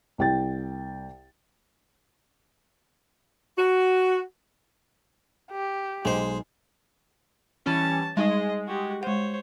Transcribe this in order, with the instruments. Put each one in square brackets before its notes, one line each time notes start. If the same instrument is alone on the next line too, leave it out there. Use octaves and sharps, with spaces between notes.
[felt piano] C2 G5 A6
[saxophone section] F#4
[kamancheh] G4
[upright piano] B1 [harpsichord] G#3 C5
[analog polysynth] E3 G3 C#4 [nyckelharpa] A5
[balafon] G3 D#4 [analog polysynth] G#3 [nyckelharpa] D#5
[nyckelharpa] F#4 G4
[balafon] G#3 F#5 [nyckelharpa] C5 C#5